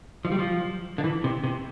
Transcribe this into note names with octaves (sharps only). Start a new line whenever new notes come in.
F3
G3
F3
D3
E3
C3
C3